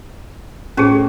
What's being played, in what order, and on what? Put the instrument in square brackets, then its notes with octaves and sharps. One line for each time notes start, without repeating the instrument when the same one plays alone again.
[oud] A2 [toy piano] C#4 G4 G#4